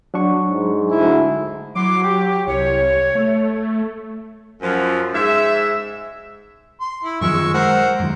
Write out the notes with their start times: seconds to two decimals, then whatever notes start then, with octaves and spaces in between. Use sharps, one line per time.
0.14 F#3 D4 C#6
0.48 G#2
0.90 D2 E4
1.75 F#3 E4 C6 D6
2.03 G4
2.47 C2 C#5
3.15 A3
4.61 F#2 F3
5.14 G#2 E5
6.81 C6
7.04 E4
7.21 F#2 D#3 F3 G#3 C#6 E6
7.54 G#3 A#4 C5 F#5
8.00 F#2 D#3